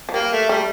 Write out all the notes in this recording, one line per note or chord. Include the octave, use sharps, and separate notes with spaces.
F3
G3 A#3
A3
G3 A3